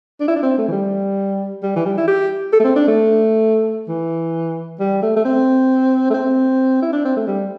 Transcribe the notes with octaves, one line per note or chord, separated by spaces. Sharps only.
D4
E4
D4
C4
A3
E3
G3
G3
E3
G3
E4
G4
A4
A3
C4
D4
A3
E3
G3
A3
A3
C4
A3
C4
E4
D4
C4
A3
G3